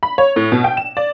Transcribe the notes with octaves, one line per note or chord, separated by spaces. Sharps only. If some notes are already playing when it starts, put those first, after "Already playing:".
B5
C#5
A2
B2
G5
E7
D5